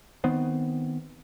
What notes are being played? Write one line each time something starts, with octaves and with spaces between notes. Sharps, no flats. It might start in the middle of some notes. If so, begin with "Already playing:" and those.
D#3 B3 C4